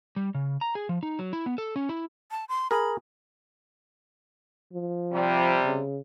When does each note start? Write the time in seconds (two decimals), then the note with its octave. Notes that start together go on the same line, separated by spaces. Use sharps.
0.16 G3
0.35 C#3
0.61 A#5
0.75 G#4
0.89 F3
1.03 D#4
1.19 F#3
1.33 E4
1.46 B3
1.58 A4
1.76 C#4
1.89 E4
2.31 A5
2.49 C6
2.71 G#4 A#4 B5
4.73 F3
5.12 C3 G3
5.65 C#3